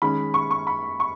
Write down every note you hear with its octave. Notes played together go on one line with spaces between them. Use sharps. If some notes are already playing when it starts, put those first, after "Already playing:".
D#3 G#3 C#4 B5
C#6
C#6
B5
C#6